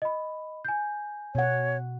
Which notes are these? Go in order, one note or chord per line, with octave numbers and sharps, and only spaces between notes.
D#5 B5
G#5 G6
B2 C#5 F#5